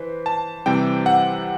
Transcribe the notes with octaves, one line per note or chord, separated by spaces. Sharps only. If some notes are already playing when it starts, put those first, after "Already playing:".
Already playing: E3 B4 C5
A5
C3 E3 G3 C4 G5
F#5